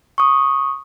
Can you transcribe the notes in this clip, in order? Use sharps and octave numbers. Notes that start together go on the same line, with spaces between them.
C#6 D#6